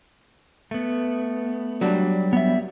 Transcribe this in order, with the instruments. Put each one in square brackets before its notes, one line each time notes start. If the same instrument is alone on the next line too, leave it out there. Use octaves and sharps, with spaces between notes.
[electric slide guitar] A3 B3
[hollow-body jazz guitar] F#3 G3 D4
[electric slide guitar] B3 E5